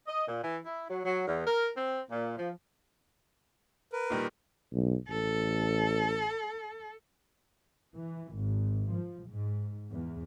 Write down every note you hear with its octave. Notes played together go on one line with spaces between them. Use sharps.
D#5
A#2
E3
E4
F#3
F#3
E2
A#4
C4
A#2
F3
A#4 B4
A#2 D#3 G3
B1
A1 A4
E3
G#1
F3
G#2
E2